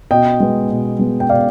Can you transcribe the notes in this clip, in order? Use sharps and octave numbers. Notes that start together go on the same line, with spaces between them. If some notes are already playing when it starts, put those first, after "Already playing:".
B2 D#5 G5
G#3 B3
B2
G#3 B3
G5
B2 D5 F5